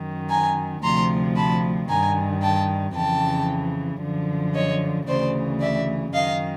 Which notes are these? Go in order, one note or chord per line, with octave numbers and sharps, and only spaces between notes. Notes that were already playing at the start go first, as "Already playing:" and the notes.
Already playing: F#2 D#3
G#5 A#5
D2 C3 F3 A#5 C6
A5 B5
G2 D#3 G#5 A#5
G5 A5
F2 C#3 E3 G5 A5
F#2 D3 F3
C#5 D#5
D2 C#3 E3 C5 D5
D5 E5
F#2 D#3 D#5 F5